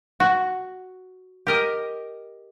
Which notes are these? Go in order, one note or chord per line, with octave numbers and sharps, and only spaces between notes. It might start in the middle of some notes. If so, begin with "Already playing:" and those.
F#4
G4 A#4 D#5